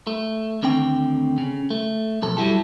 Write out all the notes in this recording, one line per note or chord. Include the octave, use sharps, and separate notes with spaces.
A3
D2 D3 D#3 C4 G5
C#3
A3
B1 F2 A4
F#2 F#3 G3 E4 G4 A4